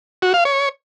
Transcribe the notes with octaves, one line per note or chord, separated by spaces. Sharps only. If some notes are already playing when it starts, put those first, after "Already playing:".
F#4
F5
C#5